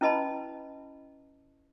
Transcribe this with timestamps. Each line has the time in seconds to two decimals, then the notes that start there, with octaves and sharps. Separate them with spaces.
0.01 C#4 E4 B4 D#5 A5 B5